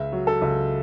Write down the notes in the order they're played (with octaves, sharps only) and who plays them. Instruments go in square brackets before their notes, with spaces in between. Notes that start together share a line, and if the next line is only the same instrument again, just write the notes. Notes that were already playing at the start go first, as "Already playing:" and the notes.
Already playing: [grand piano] C#2 E5
F#3
A4
C#2